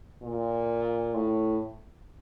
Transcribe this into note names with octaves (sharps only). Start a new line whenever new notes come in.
A#2
A2